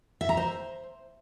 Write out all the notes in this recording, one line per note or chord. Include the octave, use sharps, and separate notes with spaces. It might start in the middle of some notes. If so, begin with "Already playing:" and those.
E5
A#5
C5